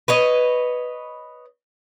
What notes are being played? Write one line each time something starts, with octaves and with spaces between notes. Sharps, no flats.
B4 C#5 D#5